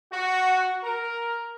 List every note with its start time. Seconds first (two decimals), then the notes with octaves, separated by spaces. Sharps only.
0.12 F#4
0.83 A#4